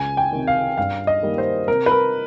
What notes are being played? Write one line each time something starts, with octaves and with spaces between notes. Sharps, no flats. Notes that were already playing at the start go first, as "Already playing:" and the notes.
Already playing: C#2 G#5
G5
C3 D#3
F5
G2 F5
D#5
D#3 G3 A#3
C5
C3 A#4
B4
A#4